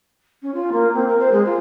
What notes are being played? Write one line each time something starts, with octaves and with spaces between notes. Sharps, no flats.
C#4
F4
A#3
C4
A#4
C5
G#3
F4